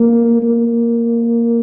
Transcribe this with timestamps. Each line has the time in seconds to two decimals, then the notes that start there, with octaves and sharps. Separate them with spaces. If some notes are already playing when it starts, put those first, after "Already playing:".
Already playing: A#3
0.42 A#3